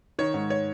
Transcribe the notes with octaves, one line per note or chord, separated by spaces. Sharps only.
D#3 C#5
G#2
C#5